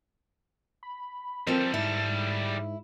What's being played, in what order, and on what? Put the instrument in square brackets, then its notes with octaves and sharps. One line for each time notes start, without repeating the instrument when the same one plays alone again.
[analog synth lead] B5
[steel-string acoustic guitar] F3 C4 [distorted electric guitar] G3 A4 [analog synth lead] A#4
[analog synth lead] G#2 [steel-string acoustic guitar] E4